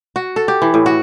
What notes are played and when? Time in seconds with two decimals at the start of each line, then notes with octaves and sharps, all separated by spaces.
0.16 F#4
0.36 A4
0.48 G4
0.62 E3
0.74 A2
0.86 F#4